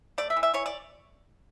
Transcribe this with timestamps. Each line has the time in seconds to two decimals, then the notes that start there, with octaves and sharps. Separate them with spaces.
0.18 A3 D5
0.30 E5
0.36 E3
0.43 E5
0.54 E3 C#5
0.66 D5